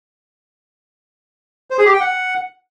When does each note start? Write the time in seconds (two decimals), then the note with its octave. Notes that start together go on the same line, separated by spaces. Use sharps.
1.70 C5
1.78 G#4
1.85 G4
1.93 G5
2.00 F#5